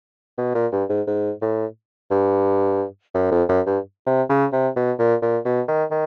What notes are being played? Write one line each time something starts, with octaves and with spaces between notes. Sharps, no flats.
B2
A#2
G2
G#2
G#2
A2
G2
F#2
F2
F#2
G2
C3
C#3
C3
B2
A#2
A#2
B2
D#3
D#3